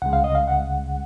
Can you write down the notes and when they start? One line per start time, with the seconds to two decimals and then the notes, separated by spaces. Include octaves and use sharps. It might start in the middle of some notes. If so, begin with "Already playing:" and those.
0.02 C#2 C#3 G#3 F#5
0.13 F5
0.24 D#5
0.35 F5
0.48 F#5